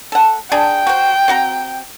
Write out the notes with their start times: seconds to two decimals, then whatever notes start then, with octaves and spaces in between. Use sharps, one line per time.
0.12 A4 F#5
0.52 D4 G#4 G5
0.87 F#4 C5
1.28 C4 F#4 A#5